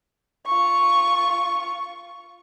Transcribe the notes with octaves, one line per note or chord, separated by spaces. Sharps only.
F4 C#6